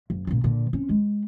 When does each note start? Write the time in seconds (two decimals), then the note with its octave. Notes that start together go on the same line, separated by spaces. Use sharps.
0.10 F#1
0.27 A#2 C#3
0.44 A#2 D3
0.73 C4 C#4
0.89 G#3